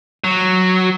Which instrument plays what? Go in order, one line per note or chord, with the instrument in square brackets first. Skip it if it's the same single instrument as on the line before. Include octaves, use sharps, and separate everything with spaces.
[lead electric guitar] F#3